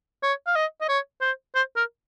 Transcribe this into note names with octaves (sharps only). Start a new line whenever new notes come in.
C#5
F5
D#5
D#5
C#5
C5
C5
A#4